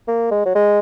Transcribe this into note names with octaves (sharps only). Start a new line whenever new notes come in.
A#3
G#3
F#3
G#3